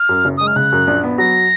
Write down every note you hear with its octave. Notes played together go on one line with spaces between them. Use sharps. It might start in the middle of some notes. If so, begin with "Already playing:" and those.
Already playing: F6
F#2
F#1
G#3 D#6
F6
C#3 F#6
F#2
A#1
B3
F#3 A#6